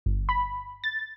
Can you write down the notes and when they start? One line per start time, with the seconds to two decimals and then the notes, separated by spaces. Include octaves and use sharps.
0.06 G1
0.29 B5
0.84 A6